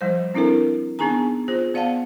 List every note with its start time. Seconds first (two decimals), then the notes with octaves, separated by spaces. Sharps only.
0.01 F3 G3 C5
0.34 C4 D4 E4 A4 A#4
0.99 B3 D4 D#4 G#4 G#5 A#5
1.48 F4 G#4 C5
1.74 B3 D5 F5 F#5 A5